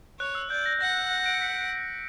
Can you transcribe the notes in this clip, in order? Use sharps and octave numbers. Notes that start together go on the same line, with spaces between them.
C#5 F#6
E6
D5 G6
A#6
F#5 A#6
D7
C#7
B6